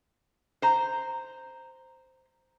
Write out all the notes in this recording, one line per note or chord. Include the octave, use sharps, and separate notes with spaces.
C5 A#5